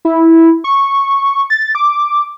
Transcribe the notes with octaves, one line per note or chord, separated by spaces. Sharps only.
E4
C#6
A6
D6